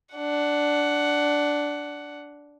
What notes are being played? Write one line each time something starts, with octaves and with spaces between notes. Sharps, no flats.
D4 F#5